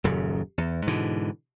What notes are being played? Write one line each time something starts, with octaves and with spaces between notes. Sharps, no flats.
D#1 F#2 C#3
E2
G#2 B2 D3 E3